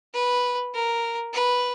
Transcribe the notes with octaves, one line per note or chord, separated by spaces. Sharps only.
B4
A#4
B4